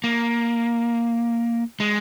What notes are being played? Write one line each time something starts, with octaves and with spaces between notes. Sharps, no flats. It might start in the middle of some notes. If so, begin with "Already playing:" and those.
A#3
G#3